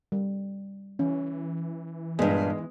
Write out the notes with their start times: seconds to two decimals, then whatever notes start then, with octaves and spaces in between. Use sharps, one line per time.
0.12 G3
0.99 E3 C#4
2.19 G2 A#2 G#3 B3